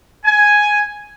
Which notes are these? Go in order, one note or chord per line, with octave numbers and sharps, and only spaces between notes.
G#5